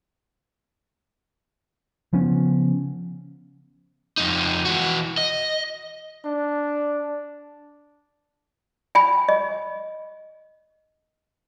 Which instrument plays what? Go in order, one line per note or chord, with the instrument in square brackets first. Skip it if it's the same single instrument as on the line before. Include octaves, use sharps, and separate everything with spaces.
[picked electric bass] C#3 F3 B3 C#4
[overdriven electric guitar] F2 D#4
E3 F#4
D#5
[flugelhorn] D4
[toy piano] G5 G#5 B5
D#5